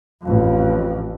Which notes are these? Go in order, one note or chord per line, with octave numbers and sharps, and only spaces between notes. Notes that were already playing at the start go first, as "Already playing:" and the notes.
A1 F2